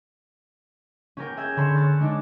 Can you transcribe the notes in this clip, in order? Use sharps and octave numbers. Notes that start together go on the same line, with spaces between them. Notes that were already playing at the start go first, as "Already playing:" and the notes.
C#4 G4 A#4 G5
G#4 E5 G6 G#6
D3 C#5 B5 C6 E7
C#5 F#6 A6
G#3 D4 D#4 D6